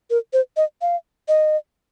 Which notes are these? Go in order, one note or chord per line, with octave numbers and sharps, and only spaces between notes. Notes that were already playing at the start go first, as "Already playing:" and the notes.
A#4
C5
D#5
F5
D#5